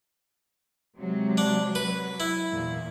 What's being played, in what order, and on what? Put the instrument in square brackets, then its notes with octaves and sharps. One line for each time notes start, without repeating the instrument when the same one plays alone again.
[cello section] C3 F#3 G#3
[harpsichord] D4
[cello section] F#3 [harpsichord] B4
[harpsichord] E4
[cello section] E2 A#2